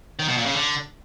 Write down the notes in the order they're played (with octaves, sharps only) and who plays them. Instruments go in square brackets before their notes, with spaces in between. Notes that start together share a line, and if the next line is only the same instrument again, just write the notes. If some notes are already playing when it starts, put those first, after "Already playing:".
[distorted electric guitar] D#3
B2
A#2
C#3
D3